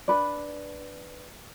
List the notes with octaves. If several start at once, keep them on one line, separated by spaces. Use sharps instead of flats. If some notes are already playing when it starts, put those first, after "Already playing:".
D4 B4 D5